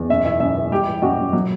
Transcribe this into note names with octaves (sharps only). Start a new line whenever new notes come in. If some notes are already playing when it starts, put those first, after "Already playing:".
Already playing: E2
F#2 E5
E3 E5
F#2 E5
E3
G3 G4
E3
F#2 F#4
F#2
F#3